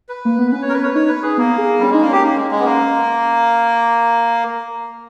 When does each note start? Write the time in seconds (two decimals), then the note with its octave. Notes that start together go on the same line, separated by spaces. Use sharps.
0.09 B4
0.25 A#3
0.39 B3
0.51 C#4 B4
0.62 C#5
0.69 A#4
0.73 B4
0.83 C#5
0.94 D#4 C#5
1.08 B4
1.23 G#4
1.37 A#3 B3
1.58 G#4
1.79 G3 C#4
1.90 G#3 D#4
2.01 A#3
2.08 C#4 G4
2.22 A#3
2.36 G#3
2.51 G#3
2.59 B3
2.65 A#3